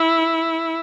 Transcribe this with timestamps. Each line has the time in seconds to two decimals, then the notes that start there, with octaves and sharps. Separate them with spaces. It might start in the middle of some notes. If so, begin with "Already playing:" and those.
Already playing: E4